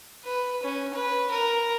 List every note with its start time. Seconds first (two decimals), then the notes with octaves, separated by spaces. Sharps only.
0.24 B4
0.63 C#4
0.94 B4
1.31 A#4